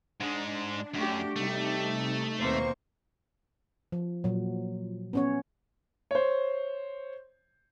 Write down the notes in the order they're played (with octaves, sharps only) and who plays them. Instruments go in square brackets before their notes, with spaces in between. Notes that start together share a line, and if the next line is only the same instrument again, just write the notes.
[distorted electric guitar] G#2 G#3 [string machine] D4
[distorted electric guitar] F#2 [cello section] A3 F#4 G4
[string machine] C3 D#4 [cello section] G3 G4 [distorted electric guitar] A3
[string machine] D#2 C4 C#6 [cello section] B2 A#3 C5
[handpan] F3
A#2 F#3
B3 C#4 C#5
[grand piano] C5 C#5